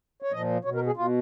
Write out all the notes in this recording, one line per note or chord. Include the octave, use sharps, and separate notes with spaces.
C#5
A#2 F3 D#5
B2 C#5
A#4
G#4
B2 F4